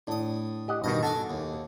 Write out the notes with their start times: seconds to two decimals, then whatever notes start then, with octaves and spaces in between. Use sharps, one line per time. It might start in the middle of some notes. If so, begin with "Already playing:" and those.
0.07 A2 D4 D#6
0.68 G4 D#5 F#5
0.84 G2 B2 D#3 D#4 D#5
1.03 F#4 A4 G#5 A5 D6
1.30 D#2